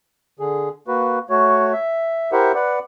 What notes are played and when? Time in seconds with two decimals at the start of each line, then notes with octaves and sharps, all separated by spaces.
0.39 D3 G#4
0.88 A#3 F#4 B4
1.30 A3 F#4 C#5
1.73 E5
2.32 E4 G4 A#4 C5 E5 F#5
2.55 B4 D5 F#5